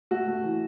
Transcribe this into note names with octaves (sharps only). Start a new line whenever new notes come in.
A3 F#4
A3
E3